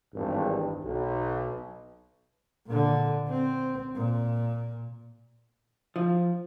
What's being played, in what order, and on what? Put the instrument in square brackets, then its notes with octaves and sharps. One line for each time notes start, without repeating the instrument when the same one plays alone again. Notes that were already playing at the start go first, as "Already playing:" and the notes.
[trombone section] G#1 E2 G2
B1
[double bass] A#2 D3
C4
A#2
[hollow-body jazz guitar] F3